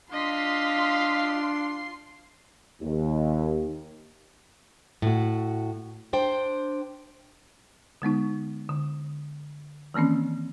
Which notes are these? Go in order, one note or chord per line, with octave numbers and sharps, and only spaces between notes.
D4 F4 D#5 F5 C6 B6 C7
D#2
A2 F#4
D4 C5 G5
D3 G#3 B3 D#4
D3
D#3 E3 A#3 C4 C#4